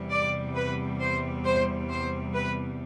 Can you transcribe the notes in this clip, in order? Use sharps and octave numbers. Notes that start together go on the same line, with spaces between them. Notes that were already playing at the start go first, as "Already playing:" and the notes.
Already playing: E2 C3 G3
D5
B4
C5
C5
C5
B4